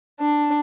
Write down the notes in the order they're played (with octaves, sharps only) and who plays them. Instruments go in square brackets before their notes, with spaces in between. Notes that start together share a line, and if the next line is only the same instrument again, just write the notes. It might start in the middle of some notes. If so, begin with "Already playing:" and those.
[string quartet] D4